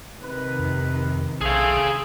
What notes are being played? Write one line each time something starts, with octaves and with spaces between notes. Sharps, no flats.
C3 D#3 B4
F2
B1 A3 C4 G#4 F5 G#5